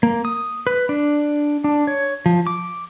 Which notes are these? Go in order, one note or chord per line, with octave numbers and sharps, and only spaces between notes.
A#3
D#6
B4
D4
D4
C#5
F3
D6